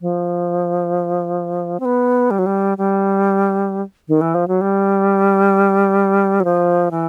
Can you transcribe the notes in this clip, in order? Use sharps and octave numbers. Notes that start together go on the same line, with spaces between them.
F3
C4
B3
G3
F#3
G3
G3
D#3
E3
F3
F#3
G3
F#3
F3
E3